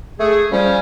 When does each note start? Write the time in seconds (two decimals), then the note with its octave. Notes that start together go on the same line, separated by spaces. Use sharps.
0.19 A3 G#4
0.52 F3 G3 C#4